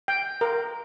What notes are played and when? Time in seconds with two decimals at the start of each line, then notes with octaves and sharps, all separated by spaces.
0.08 G5
0.41 A#4